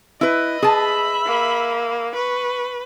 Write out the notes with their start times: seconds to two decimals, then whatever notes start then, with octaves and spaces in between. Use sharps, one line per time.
0.21 E4 B4 D#5
0.63 G#4 E5 A5 B5
1.26 A#3
2.15 B4 C#6